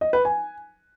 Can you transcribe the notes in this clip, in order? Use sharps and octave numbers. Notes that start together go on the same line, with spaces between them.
D#5
B4
G#5